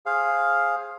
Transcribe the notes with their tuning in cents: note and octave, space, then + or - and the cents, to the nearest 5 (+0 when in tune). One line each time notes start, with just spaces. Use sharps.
G#4 +0 C5 +20 F5 +0